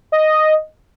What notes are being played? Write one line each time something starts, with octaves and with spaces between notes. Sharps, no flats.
D#5